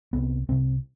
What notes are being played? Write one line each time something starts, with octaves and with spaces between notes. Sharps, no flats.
C2 C3 B3
C2 C3 C4